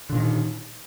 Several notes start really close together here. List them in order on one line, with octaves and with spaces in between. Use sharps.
D3 A#2 D#3